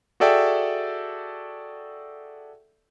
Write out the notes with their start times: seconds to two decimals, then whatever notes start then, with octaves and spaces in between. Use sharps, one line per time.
0.20 F#4 G#4 A4 D5 E5 G5